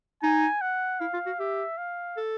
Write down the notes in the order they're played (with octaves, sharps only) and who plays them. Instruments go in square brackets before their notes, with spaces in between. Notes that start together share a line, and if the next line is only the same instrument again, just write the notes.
[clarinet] D#4 [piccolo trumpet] G#5
[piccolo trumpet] F#5
[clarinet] E4 [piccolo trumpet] F5
[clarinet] F4
F#4
[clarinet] G4 [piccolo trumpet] E5
[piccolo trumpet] F5
[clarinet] A4